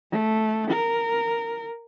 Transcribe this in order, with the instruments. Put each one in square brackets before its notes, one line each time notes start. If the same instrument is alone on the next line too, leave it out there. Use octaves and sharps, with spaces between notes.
[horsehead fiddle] A3
A#4